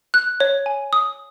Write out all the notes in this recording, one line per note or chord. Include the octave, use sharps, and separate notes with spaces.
F#6
C#5
G#5
D#6